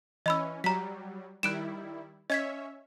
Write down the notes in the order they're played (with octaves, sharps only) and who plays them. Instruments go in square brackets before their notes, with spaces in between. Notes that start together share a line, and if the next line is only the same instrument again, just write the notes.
[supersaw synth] E3 C#4 [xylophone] D#5 B5 E6
[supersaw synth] F#3 G3 [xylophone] A#5 B6
[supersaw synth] D#3 G3 E4 [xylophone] F#6 D7 E7
[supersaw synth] C#4 C#5 E5 [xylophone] D#5 G#6 B6